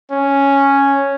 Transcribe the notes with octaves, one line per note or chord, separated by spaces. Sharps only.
C#4